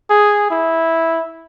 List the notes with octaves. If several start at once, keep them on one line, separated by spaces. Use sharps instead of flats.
G#4
E4